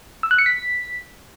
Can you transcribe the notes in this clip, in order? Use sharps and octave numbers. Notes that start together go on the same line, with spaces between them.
E6
F#6
C#7
B6